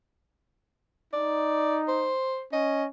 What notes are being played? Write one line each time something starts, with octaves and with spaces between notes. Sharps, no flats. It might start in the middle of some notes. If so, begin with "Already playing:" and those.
D#4 D5
C5
C#4 D#5